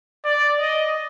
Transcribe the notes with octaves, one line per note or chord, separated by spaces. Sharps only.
D5
D#5